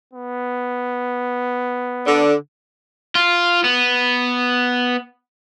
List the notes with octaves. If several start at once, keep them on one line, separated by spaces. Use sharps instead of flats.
B3
D3
F4
B3